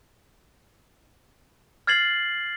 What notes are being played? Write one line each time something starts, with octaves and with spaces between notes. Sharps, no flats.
F6 G#6 A6 C7 F#7